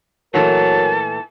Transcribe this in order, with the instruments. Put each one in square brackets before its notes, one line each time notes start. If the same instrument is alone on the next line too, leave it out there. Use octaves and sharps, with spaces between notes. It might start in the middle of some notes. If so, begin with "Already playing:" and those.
[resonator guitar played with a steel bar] A#2 E3 A3 [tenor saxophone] F#3 [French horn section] A#4 [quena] A5